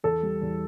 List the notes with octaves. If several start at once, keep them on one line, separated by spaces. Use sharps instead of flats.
E2 A4
G3
E2